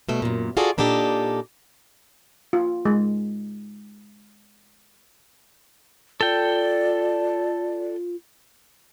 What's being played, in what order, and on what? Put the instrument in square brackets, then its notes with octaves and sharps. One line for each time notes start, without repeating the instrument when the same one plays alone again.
[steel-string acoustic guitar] B2 G3 A3
F#2 A#2
F4 F#4 G#4 A4 D5 E5
A#2 D4 D#4 G4 A4
[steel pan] F4
G#3
[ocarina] F4 [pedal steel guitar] A4 G5 [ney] D5